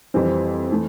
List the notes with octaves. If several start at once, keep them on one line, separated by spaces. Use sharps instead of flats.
F2 E3 G3 C4
E3 A3